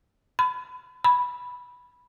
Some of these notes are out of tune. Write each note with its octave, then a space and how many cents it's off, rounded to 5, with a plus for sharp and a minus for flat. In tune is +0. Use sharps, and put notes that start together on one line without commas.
B5 +30
B5 -5